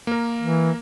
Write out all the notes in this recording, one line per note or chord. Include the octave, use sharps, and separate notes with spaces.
A#3 A#4
E3